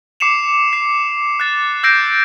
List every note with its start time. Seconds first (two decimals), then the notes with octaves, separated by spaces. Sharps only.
0.20 D6 C7 C#7 E7 F7
0.73 C7
1.40 F#6 A6
1.83 E6 G6 A#6 C7 D7